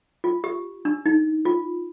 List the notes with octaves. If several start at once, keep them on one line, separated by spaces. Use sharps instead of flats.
F4
G4
D4
D#4
F4